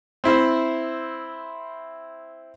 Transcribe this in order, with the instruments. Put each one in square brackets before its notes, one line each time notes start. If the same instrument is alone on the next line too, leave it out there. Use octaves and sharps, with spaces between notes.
[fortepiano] C4 E4 C5 E5